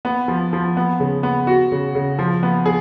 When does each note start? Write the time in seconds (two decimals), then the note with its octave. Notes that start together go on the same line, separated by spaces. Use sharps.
0.05 B3
0.28 F3
0.53 F3
0.77 B3
1.00 C#3
1.23 B3
1.47 F#4
1.72 C#3
1.95 C#3
2.19 F3
2.43 B3
2.66 G#4